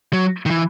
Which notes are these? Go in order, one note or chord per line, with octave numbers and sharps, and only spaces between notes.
F#3
D#3
E3